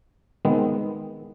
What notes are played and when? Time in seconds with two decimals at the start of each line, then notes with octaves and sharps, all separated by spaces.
0.45 D#3 G#3 B3 C4